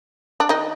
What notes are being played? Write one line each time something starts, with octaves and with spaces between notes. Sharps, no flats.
D4
D#3 D#4